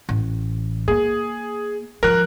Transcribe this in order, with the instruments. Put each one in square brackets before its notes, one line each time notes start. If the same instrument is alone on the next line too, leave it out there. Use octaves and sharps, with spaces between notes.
[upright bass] A1
[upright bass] A#3 [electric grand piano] G#4
[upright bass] F3 [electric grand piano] A#4 F#6